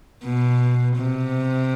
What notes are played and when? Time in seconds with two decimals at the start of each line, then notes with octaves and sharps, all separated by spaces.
0.23 B2
0.96 C3